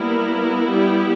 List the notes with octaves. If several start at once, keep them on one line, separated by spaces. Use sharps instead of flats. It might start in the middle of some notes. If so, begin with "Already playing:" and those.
Already playing: G3 A#3 B3 E4 A#4
G3 G4